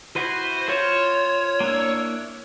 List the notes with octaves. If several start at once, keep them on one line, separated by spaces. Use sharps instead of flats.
E4 F#4 B4 C5
F4 C5 C#5
A#3 D4 E4